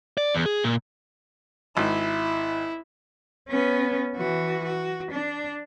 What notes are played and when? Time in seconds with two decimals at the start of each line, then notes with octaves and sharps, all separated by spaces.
0.18 D5
0.35 E2
0.46 G#4
0.63 A#2
1.77 G#1 E4
3.49 B3 C#4
4.16 E3 F#4
4.65 F#4
5.12 D4